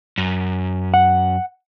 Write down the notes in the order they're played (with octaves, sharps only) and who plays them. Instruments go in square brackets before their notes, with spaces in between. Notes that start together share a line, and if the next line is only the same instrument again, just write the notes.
[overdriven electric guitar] F#2
[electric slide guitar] F#5